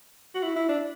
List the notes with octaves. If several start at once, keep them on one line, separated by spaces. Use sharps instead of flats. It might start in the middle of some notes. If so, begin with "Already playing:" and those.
F#4
E4
E4
D4